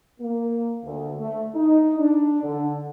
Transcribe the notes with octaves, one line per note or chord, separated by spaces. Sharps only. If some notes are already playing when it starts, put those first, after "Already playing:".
A#3
D2
A3
D#4
D4
D3